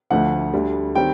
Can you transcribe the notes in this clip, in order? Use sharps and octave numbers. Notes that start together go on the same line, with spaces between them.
D2 D3 F3 A3 F#5
D2 D3 G3
D#3 G3 C4 G5